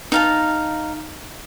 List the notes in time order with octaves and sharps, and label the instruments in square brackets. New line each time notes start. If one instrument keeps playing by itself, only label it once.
[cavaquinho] D#4 F5 A5